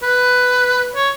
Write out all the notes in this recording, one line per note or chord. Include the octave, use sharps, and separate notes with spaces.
B4
C#5